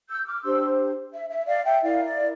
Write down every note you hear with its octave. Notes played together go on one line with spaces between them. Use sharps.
E6 G6
D6 F6
D4 G4 C5 C6 E6
E5
E5
D5 F5
E5 G5
E4 A#4 D5 F5
D5